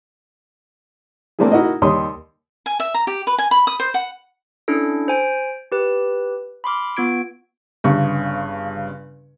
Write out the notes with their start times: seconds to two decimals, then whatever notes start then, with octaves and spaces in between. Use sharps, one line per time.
1.39 A3 A#3 C4 D4 E4 G#4
1.52 D#4 E4 F#4 A#4 D#5
1.82 D#2 G3 C#5 C6 D#6
2.66 G#5
2.80 E5
2.94 A#5
3.07 G4
3.27 B4
3.38 G#5
3.51 B5
3.67 D#6
3.80 C5
3.94 F#5
4.68 C#4 D4 E4 A4
5.08 C5 G#5 D7
5.72 G4 B4
6.64 B5 C6 D6 F6
6.97 B3 F4 G#6 D7
7.84 G1 G2 C#3 C#6